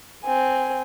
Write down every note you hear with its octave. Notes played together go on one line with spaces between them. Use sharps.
C4 G#5